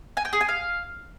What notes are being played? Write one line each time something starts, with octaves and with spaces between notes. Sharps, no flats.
G#5
G5
G#4
G#5
F5